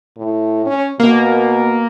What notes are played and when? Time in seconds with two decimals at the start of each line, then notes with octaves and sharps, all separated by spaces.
0.17 A2
0.66 C#4
1.00 B2 A#3